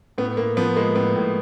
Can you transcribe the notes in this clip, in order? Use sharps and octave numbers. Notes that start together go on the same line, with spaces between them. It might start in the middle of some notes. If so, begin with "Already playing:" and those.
A2 B3
A2 A#3
F3 B3
G#3 A#3
A2 B3
A2